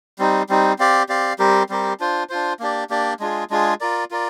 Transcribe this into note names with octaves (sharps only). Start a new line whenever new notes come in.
G3 C4 D#4
G3 C4 D#4
C4 G4 D5 F5
C4 G4 D5 F5
G3 C4 G4 A#4
G3 C4 G4 A#4
D4 F4 C5
D4 F4 C5
A#3 D4 G4 D5
A#3 D4 G4 D5
G#3 D4 F4 G#4
G#3 D4 F4 G#4
F4 A#4 D5
F4 A#4 D5